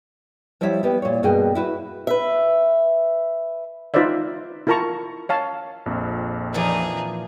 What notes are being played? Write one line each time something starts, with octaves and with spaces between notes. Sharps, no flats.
F3 G3 E4 C#5 E5
G3 B3 G4
A#2 C#5
G2 B2 A#3 G#4 G5
E4 F#4 B4
B4 E5
D#4 F4 B4 C5 D5 E5
E4 F4 A#4 A5 A#5 C#6
C#5 F5 A5
A#1 F2
A#2 E3 F3 D#4 G#4